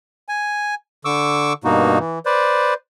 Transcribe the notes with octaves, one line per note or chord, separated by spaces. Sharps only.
G#5
D3 C#6 D6 E6
G2 B2 A#3 D#4 F#4
E3
B4 C5 D5